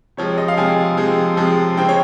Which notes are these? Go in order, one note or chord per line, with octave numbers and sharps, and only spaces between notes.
C3 F3 G#3 C#5
D#5
F5
C3 F3 G#3 G#5
C3 F3 G#3
C3 F3 G#3
C#3 G#3 C4 G5
C#5